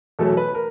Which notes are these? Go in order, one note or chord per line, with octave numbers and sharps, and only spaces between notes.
E2 B2 F#3 A3 A4
B4
A#4